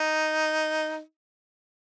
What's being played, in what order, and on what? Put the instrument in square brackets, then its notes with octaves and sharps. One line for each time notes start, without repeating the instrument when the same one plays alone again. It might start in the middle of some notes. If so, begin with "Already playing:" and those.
Already playing: [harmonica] D#4